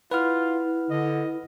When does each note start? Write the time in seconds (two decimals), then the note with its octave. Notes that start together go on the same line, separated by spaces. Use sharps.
0.11 E4 F4 B4 F#5 F6
0.90 D3 D#5